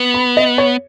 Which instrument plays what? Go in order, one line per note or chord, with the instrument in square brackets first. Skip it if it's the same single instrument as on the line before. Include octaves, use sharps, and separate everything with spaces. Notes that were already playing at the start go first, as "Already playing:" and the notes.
Already playing: [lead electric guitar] B3
[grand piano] B5
D#5
C#5